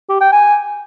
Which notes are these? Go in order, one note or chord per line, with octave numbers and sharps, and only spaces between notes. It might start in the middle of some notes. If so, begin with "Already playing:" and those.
G4
G5
G#5